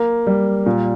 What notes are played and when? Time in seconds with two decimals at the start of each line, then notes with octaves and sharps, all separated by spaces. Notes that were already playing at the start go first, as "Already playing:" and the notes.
Already playing: A#3
0.27 G3
0.66 A#2